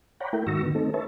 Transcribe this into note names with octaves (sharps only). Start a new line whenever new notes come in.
C#5 D5 F#5 G5 A#5 B5
A3 E4 A#4 G5
G#2 D#3 F#4 C#6 E6 A#6
D3 D#3 B3
A3 C4 D#4 A4
B4 C#5 E5 A5